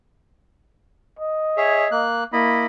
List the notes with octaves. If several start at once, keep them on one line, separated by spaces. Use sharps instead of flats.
D#5
G#4 C#5 E5
A#3 F#6
A#3 E4 D#5 B5